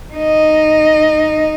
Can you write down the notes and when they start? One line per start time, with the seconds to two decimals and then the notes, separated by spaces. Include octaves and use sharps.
0.14 D#4 D#5